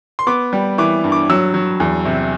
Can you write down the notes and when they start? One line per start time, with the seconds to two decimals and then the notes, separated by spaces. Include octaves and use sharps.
0.19 C6
0.27 B3 D6
0.53 G3
0.78 E3 D6
1.04 G2
1.12 D6
1.30 F#3 E6
1.54 F#3
1.80 E2
2.05 C3